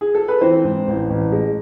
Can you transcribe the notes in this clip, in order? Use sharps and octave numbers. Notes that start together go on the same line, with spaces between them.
G#4
A4
B4
E3 C4 C5
G#2
A1
A1
G#3